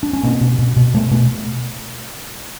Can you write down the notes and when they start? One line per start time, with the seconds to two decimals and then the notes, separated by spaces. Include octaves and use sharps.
0.03 D4
0.13 C#4
0.23 B2 A#3 C4
0.41 B2
0.59 B2
0.76 B2
0.94 B2 A3 B3
1.11 B2 A3 B3